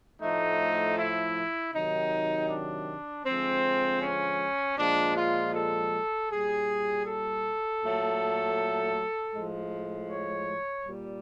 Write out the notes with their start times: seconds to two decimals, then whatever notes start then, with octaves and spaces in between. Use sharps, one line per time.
0.21 A2 F3 A3 D#4
0.97 E4
1.73 C3 D#3 F#3 D#4
2.49 D4
3.25 D3 F3 G#3 C4
4.01 C#4
4.78 A#2 F3 G#3 D4
5.15 F4
5.54 A4
6.30 A#2 G3 G#4
7.06 A4
7.82 A#2 F#3 A3
9.34 A2 F3 G#3
10.09 C#5
10.86 A#2 G3